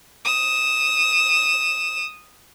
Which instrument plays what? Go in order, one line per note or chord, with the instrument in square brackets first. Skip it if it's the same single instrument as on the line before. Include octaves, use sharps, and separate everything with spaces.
[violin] D#6 E7